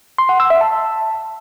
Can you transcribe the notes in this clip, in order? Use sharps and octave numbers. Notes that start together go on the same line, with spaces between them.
C6
F#5
E6
E5
A5